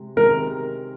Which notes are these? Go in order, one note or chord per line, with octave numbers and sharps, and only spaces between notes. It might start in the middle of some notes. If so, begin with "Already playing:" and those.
Already playing: C3 G#3
C3 D#3 G#3 A#4